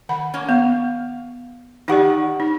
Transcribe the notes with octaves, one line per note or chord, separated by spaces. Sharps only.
D#3 F#5 B5
A#3 C#4
B3 F5
D#3 D#4 G4 D5 F#5
D#4